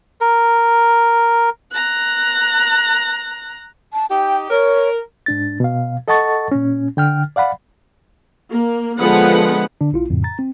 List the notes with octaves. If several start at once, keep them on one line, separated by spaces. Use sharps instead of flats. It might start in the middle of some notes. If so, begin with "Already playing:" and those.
A#4
A#5 F#6
A5
D#4 G4 G5
A#4 C#5
G#2 D4 A6
B2 F5
A4 D#5 F#5 A5 C#6 A6
A#2 C#4
D3 G5 F6
D5 F5 F#5 B5
A#3
D3 F3 G#3 B3 B4 F#5
D3 D4
A#1 E4 F4
F2 A2 C#3
A#5 A6
C4